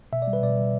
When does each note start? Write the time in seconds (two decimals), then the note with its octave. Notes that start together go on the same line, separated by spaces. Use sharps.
0.12 B2 E5
0.22 D5
0.27 G3
0.33 B4
0.42 B2 D5
0.57 G3